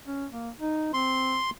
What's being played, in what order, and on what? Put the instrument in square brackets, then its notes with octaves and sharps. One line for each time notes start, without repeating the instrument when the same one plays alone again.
[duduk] C#4
A#3
D#4
[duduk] C4 [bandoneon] C6